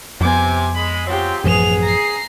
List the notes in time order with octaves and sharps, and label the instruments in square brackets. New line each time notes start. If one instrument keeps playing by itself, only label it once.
[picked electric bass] F2 B3 [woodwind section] C3 [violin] G#5 D6
[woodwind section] G#3 [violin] B5
[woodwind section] F#3 G#3 C4 [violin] F4 G4
[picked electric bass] A1 F#2 F3 [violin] B3 F7 [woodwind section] G#4
[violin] A#5 C7